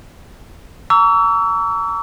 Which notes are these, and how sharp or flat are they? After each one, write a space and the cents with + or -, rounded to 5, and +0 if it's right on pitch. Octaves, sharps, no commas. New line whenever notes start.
A#5 -25 C#6 +45 E6 +0